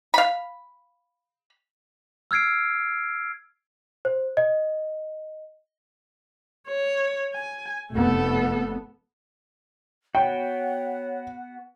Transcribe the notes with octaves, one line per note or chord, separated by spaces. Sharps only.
F5 B5
E6 F6 G#6 C7 D7
C5
D#5
C#5
G#5
F1 A3 B3 A4
B3 F#4 C#5 F#5 G5